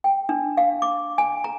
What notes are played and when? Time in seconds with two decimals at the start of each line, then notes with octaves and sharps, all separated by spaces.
0.04 G5
0.29 D4
0.57 F5
0.82 D6
1.18 G#5
1.44 A#5